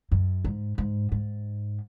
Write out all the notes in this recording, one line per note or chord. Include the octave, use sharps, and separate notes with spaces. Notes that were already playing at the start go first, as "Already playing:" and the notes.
F#2
G#2
G#2
G#2